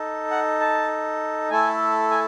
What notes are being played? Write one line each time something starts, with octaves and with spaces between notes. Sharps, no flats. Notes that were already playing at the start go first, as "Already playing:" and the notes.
Already playing: D#4 A4
F#5
A5
A3 E4 A4 G#5
G#5